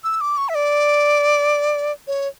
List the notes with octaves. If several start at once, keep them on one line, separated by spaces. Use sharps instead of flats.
E6
D6
C#6
E5
D5
C#5